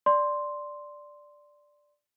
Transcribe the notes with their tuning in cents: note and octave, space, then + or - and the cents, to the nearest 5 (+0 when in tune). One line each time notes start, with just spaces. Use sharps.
D5 +0 C6 +0